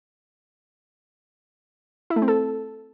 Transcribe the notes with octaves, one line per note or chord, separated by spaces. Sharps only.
E4
A3
C4
A4